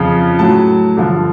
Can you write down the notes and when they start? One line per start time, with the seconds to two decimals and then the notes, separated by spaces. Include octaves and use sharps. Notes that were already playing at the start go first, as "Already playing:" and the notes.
Already playing: F2 C#3 F3
0.39 A2 F#3 A5
0.96 G2 D3 F3